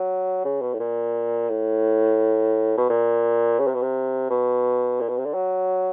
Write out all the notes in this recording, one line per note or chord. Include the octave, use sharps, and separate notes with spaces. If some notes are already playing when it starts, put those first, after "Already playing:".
Already playing: F#3
C#3
B2
A2
A#2
A2
B2
A#2
C#3
C3
B2
C3
B2
A#2
B2
C3
D3
F#3